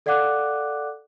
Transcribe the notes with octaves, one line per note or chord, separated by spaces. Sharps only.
A4 D5 F5 F#5 D6 F#6